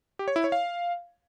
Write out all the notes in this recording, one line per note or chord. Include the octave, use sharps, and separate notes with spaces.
G4
C#5
E4
C#5
F5